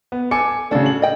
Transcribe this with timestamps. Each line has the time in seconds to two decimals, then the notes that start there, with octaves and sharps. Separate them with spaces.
0.12 B3
0.31 A4 G#5 D6 C#7
0.71 A2 C#3 D4 F#4 A4
0.86 F#7
1.02 D#5 G5